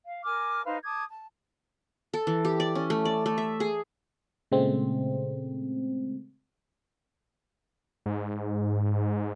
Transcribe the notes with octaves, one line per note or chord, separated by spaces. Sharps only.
F5
A#4 G#5 D6 F6
D#4 B4 C5 F5
A5 D6 D#6 G#6
A5
A4
E3
G4
D5
C#4
A3
D5
A3
E5
G#4
A#2 C#3 G#3 A3 C4
G#2